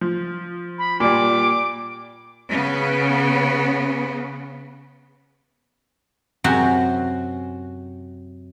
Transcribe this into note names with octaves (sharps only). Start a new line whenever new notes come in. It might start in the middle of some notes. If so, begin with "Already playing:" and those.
F3
B5
A#2 G3 D6
C#3 B3
F#2 C3 F#4 C5 C6